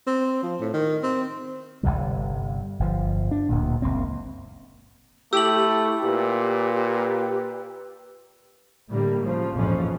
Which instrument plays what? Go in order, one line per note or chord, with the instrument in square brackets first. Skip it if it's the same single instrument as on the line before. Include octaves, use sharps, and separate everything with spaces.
[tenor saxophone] C4
F3
A2
D#3
C4
[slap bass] G1 C2 C3 G3
G1 F3
D4
D1 D2 A#2
F#1 C#2 A#3 C4
[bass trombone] A3 [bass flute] E4 [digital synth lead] G4 [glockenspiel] E6 F#7
[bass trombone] A#2 [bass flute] B4
[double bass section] A2 D3 G3 A#3
C#3 F3
A#1 F2 G#2 E3 F3 C#4